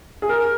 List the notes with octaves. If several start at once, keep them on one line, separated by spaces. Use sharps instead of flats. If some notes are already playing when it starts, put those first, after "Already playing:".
G#4
A#4